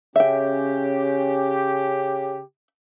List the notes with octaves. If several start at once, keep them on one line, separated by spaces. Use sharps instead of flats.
C#3 C#4 G4 E5 G5